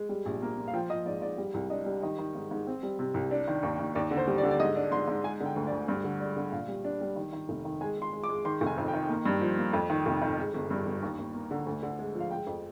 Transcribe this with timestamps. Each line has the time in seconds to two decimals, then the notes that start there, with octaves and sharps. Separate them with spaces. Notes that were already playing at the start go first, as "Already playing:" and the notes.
Already playing: G#3
0.09 G3
0.26 A#1
0.42 A#3
0.58 A#2
0.68 F5
0.73 F3 G5
0.90 F3 D#5
1.06 G#2 D5
1.22 G#2 D5
1.38 G3
1.54 C2
1.70 D4 D#5
1.86 G3
2.02 D#3 D#5
2.18 D#3
2.35 G#2
2.51 G#2
2.67 C4
2.83 G3
2.99 C3
3.14 C2
3.31 D4
3.48 D#3
3.63 D#2
3.79 D#2
3.95 D#2 D5
4.11 D3
4.17 C5
4.27 G3
4.38 D5
4.43 D3
4.51 D5
4.60 G#2 D#5
4.76 D4
4.91 G#2 C6
5.08 G#2
5.24 G#3 G#5
5.40 D3
5.46 G5
5.56 D2
5.67 D5
5.72 D2
5.88 G2 D5
6.04 D3
6.20 G#3 D5
6.37 D3
6.52 A#1 F5
6.68 G3
6.84 D4
7.01 G3
7.16 D#3
7.33 D#3
7.49 F1
7.65 D#3
7.81 G#3 G#5
7.97 G#3 C6
8.13 G#3
8.24 D6
8.29 G#3
8.45 D#3 C6
8.61 F1
8.67 G#5
8.78 F2
8.88 G5
8.94 D#3
9.10 A#3
9.25 G2
9.41 F3
9.58 A#3
9.73 F2
9.90 D#3
10.06 F1
10.22 D#3
10.38 G#3
10.54 G1
10.70 G2
10.86 G1
11.02 D#2
11.18 D#2
11.35 A#3
11.51 D3
11.66 D2
11.83 D3
11.99 G#3
12.15 F3
12.20 F5
12.31 G#3 G5
12.47 F2